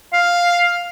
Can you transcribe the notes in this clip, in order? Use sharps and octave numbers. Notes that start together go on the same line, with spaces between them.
F5